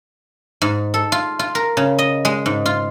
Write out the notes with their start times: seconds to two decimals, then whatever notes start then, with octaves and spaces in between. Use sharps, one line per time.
0.62 G#2
0.94 A4
1.12 F4
1.39 F4
1.55 A#4
1.77 C#3
1.98 D#5
2.25 G#3
2.46 G#2
2.66 F4